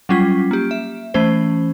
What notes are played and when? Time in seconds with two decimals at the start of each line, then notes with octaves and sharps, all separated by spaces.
0.09 F#3 G3 C#4 F4 B6
0.51 A#3 G4
0.71 E5
1.14 E3 A3 C#4 C5